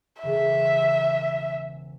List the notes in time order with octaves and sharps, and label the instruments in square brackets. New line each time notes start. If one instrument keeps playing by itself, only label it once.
[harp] E1 C#3 [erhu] E5